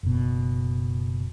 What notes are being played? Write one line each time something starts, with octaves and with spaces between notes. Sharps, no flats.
F#1 B2